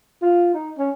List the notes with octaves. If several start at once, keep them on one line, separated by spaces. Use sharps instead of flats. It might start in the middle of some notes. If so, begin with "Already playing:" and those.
F4
D#4
C#4